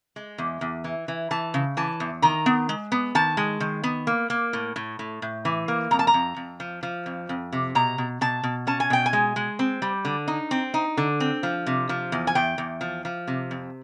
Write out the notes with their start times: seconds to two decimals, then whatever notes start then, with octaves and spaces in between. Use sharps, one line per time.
0.16 G#3
0.38 E2
0.61 E2
0.84 E3
1.08 E3
1.31 E3 A5
1.54 C#3
1.77 E3 A5
2.00 E2
2.22 D#3 A#5
2.46 B3
2.69 G#3
2.92 B3
3.15 D#3 A5
3.37 G#3
3.60 D#3
3.83 B3
4.07 A#3
4.30 A#3
4.53 A2
4.76 A2
4.99 A2
5.22 A2
5.45 E3
5.68 A#3
5.91 F2 A#5
5.99 A5
6.07 A#5
6.14 F2
6.36 F2
6.60 F3
6.83 F3
7.06 F2
7.29 F2
7.52 C3
7.75 B2 A#5
7.98 B2
8.21 B2 A5
8.44 B2
8.67 C#4 A5
8.80 G#5
8.90 B2 G5
9.06 G#5
9.13 G#3
9.36 G#3
9.59 C4
9.82 G3
10.05 D3
10.28 D#4
10.51 C4
10.74 D#4
10.97 D3
11.20 C4
11.43 F3
11.67 C3
11.89 F3
12.12 E2
12.27 G#5
12.35 E2 G5
12.58 E2
12.81 F3
13.05 F3
13.27 C3
13.51 F2